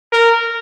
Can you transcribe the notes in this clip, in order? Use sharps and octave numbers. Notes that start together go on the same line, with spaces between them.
A#4